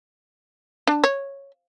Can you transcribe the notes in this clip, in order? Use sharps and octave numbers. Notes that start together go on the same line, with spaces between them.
D4
C#5